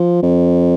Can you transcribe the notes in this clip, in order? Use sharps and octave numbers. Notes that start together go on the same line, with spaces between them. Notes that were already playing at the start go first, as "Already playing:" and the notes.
Already playing: F3
F2